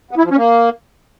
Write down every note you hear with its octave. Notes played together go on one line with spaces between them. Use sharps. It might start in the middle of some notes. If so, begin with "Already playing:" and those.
B3
E4
F3
C#4
A#3